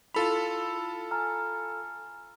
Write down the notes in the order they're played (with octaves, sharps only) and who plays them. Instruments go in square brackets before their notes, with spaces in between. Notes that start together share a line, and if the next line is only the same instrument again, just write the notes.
[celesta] E4 F7 [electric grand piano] F4 A4 B5
[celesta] G#5 A#5 F6